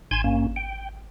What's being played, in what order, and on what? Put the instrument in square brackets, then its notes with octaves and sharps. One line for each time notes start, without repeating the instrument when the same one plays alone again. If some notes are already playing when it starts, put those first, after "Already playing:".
[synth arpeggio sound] G#1 E7 [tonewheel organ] G#5 C6 G#6
[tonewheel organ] G2 A#3 C#4
G5